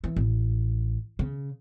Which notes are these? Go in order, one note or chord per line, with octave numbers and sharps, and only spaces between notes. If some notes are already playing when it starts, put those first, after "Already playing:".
E3
A1
C#3